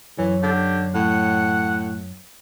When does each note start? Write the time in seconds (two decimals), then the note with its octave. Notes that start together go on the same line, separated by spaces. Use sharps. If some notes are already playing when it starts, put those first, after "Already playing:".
0.19 F#2 E3 C#5
0.43 D3 G4
0.95 A2 F#5